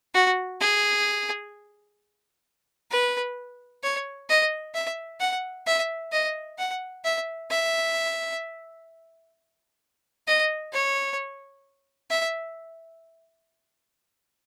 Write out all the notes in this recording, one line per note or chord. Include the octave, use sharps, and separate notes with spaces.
F#4
G#4
B4
C#5
D#5
E5
F#5
E5
D#5
F#5
E5
E5
D#5
C#5
E5